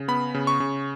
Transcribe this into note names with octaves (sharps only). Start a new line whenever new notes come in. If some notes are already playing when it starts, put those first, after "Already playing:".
Already playing: C#3
B3 B5
C#3
C#6
C#3